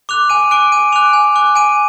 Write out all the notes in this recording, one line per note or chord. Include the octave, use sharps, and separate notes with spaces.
D6 F#6 F7
G#5 D#7
D6 F#6 D7
G#5 D#7
D6 F#6 F7
G#5
D6 F#6
G#5 D#7